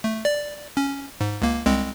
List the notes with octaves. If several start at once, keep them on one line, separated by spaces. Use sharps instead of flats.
A3
D5
C#4
G#2
C#2 A#3
C2 G#3 C4